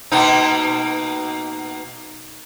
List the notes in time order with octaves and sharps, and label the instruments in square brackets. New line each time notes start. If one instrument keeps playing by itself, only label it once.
[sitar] B2 A#3 D#4